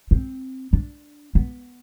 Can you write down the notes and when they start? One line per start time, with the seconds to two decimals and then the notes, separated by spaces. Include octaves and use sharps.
0.11 C4
0.73 D4
1.35 B3